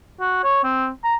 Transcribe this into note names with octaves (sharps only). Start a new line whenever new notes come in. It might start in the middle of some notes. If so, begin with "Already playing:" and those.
F#4
C#5
C4
A#5